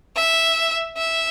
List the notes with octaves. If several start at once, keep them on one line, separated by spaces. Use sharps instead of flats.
E5
E5